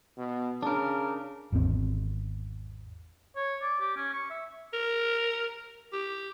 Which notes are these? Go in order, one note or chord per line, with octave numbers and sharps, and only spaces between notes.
B2
C#3 D4 A#4
G#1 E2 D#3 C4
C#5
D5
G4
C#4
C#6
E5
A#4
G4